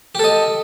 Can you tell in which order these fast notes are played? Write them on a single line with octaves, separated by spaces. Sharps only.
G4 A4 D#5